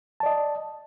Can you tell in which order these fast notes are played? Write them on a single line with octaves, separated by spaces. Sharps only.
A5 D5 D#5